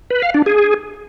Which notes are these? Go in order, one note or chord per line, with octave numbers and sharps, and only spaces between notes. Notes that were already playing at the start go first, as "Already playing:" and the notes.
B4
F5
D4
G#4